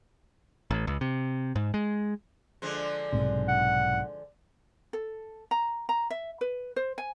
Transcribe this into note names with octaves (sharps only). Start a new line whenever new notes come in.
A1
C#2
C3
G#2
G#3
D3 F3 G#3
B1 G#2 C3
F#5
A4
A#5
A#5
E5
B4
C5
G#5